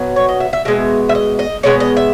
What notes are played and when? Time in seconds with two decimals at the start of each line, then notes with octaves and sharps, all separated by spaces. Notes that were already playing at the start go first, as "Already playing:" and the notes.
Already playing: B2 F#3 B3
0.16 C#5
0.29 D#5
0.40 E5
0.53 E5
0.65 B2 G#3 B3 E5
1.09 E5
1.15 D#5
1.39 D#5
1.63 B2 G#3 B3 C#5
1.80 D#5
1.97 E5